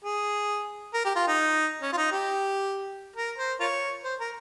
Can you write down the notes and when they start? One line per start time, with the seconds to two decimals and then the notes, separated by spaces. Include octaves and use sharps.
0.05 G#4
0.94 A#4
1.05 G4
1.16 F4
1.27 D#4
1.82 C#4
1.93 F4
1.97 D#4
2.12 G4
3.16 A#4
3.38 C5
3.60 F4 A#4 C#5
4.04 C5
4.20 A#4